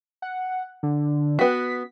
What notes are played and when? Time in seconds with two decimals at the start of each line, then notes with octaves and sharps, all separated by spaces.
0.22 F#5
0.83 D3
1.39 B3 F#4 B6